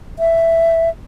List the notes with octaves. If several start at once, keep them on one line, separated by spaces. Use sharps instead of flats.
E5